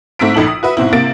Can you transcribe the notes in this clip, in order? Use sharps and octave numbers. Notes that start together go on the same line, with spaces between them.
G#2 A3 C4 E6 B6 D7
A#1 D#4 A4 F#7
D#6
F#4 B4 E5
G#2 B2 C4 E4
C3 A#3 A6 D7